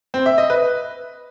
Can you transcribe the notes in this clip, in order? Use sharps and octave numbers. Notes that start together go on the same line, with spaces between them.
C4
E5
D#5
B4